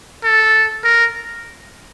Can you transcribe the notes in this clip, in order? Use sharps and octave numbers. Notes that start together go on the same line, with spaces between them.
A4
A#4